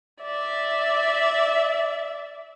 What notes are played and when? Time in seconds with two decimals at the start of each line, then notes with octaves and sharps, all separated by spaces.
0.23 D5 E5